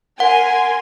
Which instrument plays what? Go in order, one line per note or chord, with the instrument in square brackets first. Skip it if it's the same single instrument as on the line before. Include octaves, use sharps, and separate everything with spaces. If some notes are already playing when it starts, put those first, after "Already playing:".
[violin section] A#4 G#5 C6 [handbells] F#5